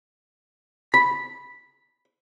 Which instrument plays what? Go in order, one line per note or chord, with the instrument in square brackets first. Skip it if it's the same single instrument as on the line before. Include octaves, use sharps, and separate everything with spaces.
[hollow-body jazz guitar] B5